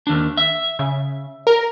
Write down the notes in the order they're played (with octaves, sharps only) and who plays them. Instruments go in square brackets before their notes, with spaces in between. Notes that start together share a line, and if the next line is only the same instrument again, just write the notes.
[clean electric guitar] D#2 D4
E5
[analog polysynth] C#3
A#4